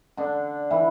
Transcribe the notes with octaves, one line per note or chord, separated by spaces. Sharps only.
D3 D4
E3 E4